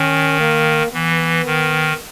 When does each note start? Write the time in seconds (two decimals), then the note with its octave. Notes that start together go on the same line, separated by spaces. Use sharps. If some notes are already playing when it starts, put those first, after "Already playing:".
Already playing: D#3 C#4
0.40 A#3
0.93 E3 B3
1.45 D#3